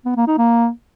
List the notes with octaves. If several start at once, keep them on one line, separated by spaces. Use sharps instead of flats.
B3
A#3
D#4
A#3